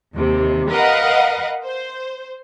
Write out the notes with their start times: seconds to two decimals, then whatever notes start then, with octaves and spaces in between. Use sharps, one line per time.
0.15 D#2 C3
0.70 A#4 B4 D#5 F5 F#5
1.63 C5